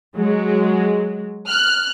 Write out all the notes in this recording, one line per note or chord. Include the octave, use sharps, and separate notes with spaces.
F#3 G#3
F6 F#6